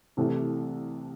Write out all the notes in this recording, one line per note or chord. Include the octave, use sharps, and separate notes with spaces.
C2 C3 E3 A3